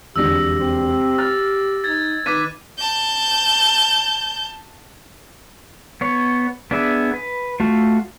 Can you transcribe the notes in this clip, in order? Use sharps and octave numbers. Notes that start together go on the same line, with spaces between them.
E1 F2 D3 G4 E6 A#6
C4
F6 A6
D#4 G#6 A6
D#3 B4 D6 F#6 B6 D#7
A5 G6
B3 C#5
B3 D4 G#4 E5
B4
A3 F4 F#4